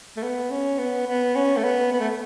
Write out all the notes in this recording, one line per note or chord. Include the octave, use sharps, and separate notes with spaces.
A3
B3
C#4
B3
B3
C#4
A3
B3
B3
A3